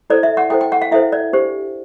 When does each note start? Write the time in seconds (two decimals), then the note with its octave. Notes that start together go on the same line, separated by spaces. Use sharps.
0.10 E4 A4 C5 D5
0.23 E5
0.37 F#5
0.50 E4 A4 C5 G5
0.61 G5
0.72 F#5
0.82 F5
0.91 E4 A4 C5 E5
1.12 D5
1.33 D4 G4 C5